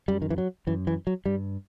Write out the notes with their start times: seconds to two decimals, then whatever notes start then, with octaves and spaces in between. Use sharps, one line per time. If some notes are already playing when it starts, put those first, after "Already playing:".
0.08 F#2 G3
0.22 D#3
0.30 E3
0.38 F#3
0.67 F#2 E3
0.87 E3
1.07 F#3
1.26 G2 G3